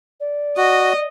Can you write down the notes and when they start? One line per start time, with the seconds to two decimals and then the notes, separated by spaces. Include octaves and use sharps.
0.20 D5
0.57 F#4 D#5